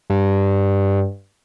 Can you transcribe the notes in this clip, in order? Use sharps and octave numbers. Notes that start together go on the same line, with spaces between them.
G2